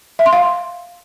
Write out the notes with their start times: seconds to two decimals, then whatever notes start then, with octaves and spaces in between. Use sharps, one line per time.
0.19 E5
0.26 C6
0.33 F5